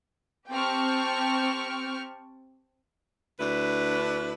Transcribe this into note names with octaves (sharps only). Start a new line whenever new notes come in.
C4 G4 G5 A5 C#6 F6
D2 D4 E4 B4